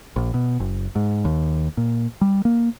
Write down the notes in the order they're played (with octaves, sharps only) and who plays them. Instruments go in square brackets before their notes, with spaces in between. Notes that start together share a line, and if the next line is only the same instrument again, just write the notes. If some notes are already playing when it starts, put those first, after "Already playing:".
[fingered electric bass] A#1
B2
F#1
G#2
D#2
A#2
G3
A#3